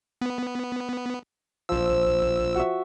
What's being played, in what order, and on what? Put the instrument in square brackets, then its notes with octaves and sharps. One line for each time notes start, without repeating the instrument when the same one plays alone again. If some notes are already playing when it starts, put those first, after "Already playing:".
[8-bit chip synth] B3
[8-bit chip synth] A#1 E6 [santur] F3
[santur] F#4 E5